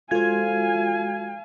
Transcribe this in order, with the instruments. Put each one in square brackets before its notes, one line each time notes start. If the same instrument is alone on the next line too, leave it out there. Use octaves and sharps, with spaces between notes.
[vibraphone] G#3 F#4 [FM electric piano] F4 G#6 [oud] A4 C5 [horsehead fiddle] F5 G#5